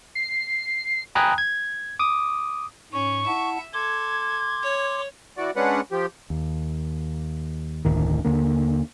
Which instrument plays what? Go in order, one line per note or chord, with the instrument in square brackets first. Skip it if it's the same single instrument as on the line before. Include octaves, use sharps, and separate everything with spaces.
[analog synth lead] C7
[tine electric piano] G5 G#5 A#5 B5 D#6 F#6
G#6
D6 D#6
[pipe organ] G#2 [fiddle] C#4 [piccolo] C#6
[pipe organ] E4 F#5 A5 [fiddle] E5
[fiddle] A4 [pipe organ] C6 D6 [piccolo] G#6
[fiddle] C#5
[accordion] E3 F#4 D5
G#3 C#4 D4 B4 F#5
F3 G4
[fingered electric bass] D#2
F1 D2 A2 D#3
D#2 D3 A#3